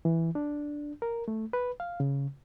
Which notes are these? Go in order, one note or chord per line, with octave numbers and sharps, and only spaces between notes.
E3
D4
A#4
A3
B4
F5
C#3